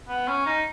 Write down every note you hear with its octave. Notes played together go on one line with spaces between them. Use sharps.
B3
C#4
D#4